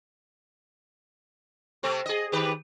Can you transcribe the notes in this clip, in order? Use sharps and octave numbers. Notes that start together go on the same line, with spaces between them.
C3 A3 C4
G#4 D#5
D#3 G4 B4